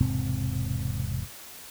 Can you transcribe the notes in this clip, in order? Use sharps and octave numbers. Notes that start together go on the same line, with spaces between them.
E1 G#2 C3 C4